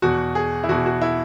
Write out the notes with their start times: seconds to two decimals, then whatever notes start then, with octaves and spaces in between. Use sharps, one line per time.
0.02 E2 B2 F#4
0.35 G#4
0.64 E4
0.68 E2 B2 F#4
0.86 F#4
1.02 E4